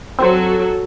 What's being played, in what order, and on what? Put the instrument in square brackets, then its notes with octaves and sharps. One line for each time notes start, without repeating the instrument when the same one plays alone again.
[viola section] F#3 F#4 A4 [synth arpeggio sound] C4 C5